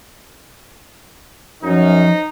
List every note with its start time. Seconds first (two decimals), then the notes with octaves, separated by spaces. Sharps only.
1.64 F#2 F3 C#4 D#4